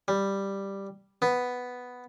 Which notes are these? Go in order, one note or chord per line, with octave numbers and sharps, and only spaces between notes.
G3
B3